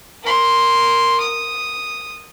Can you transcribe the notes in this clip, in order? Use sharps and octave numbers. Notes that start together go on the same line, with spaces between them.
A#4 C6
D#6